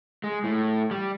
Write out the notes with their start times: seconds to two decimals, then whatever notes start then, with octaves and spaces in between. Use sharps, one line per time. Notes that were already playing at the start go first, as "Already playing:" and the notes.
0.24 G#3
0.44 A2
0.91 G3